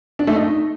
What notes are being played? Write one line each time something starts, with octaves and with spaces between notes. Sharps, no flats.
D4
A3
D#4